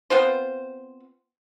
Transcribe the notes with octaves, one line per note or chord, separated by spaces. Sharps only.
B3 C4 F4 C5